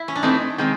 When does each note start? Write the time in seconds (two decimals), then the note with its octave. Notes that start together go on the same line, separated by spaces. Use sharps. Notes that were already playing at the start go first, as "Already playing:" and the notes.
Already playing: E4
0.08 C#4
0.15 D4
0.23 E3 A3 C4 D#4
0.58 D#3 G#3 C4